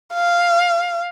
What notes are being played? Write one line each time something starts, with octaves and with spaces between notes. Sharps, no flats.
F5